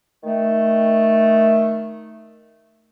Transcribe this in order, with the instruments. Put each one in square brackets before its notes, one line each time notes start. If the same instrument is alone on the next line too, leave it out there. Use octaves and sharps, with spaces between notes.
[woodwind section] D#3 A3